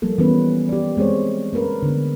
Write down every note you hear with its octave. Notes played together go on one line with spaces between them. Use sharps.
F3 G3 A#3 A4
E3 G3 B3 C#4 B4
G4 D5
G#3 C4 C5 C#5
A#3 C#4 A#4 B4
D3 B3